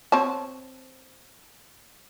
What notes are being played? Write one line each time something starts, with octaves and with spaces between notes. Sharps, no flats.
C4 C#5 A5